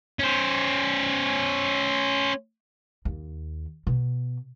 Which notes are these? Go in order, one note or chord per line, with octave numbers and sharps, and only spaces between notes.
C#4 C5
D#2
B2